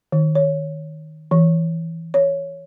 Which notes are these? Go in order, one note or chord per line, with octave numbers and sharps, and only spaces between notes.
D#3
C#5
E3
C#5